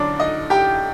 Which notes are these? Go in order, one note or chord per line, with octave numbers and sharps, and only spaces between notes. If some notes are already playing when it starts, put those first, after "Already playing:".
Already playing: F#2 D3 F#3 D4 D5
D#4 D#5
G4 G5